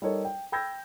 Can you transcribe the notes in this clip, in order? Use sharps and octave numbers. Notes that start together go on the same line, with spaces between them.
G3 D#4 A4 A#4 C#5
G5
G5 B5 E6 G6 G#6 A#6